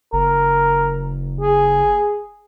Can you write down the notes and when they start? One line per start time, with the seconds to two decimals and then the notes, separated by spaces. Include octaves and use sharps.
0.13 F#1 A#4
1.41 G#4